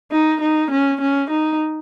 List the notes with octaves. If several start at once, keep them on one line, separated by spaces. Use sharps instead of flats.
D#4
D#4
C#4
C#4
D#4